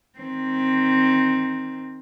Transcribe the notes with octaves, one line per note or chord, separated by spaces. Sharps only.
D#3 C4